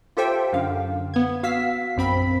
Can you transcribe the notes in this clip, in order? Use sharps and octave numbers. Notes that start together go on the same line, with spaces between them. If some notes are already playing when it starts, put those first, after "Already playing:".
F4 G4 A4 C5 E5 G5
F#2 D3 F5
B3 G#6
F#4 F5 E6 B6 C7
A#1 F#2 C4 B5 B6